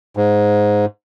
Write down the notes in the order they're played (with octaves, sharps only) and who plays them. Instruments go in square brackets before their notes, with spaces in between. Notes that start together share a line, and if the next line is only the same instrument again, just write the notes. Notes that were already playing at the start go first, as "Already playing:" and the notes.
[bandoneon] G#2